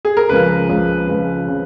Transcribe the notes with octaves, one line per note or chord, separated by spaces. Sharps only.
G#4
A#4
C#2 C#3 F3 B4
C#2 C#3 F3
C#2 C#3 F3 B4
C#3 F3